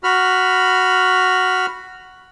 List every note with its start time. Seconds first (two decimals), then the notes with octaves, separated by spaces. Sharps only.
0.04 F#4 B5 F6